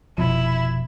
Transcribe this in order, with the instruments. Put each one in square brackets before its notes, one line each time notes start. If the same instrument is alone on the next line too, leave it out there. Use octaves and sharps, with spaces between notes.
[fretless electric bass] F1 B2 F3 [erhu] E4